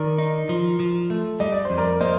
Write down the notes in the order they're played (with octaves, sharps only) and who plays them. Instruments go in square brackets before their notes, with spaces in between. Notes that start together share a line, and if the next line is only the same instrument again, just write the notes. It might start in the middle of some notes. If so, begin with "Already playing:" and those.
Already playing: [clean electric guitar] D#3 [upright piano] A#4 D5
[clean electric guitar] D#4
F3
F3
A3
[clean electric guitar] G3 [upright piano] D#5
[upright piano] D5
C5
[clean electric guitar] F2
[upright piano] A#4 D5
[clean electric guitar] A#3 [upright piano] C5 D#5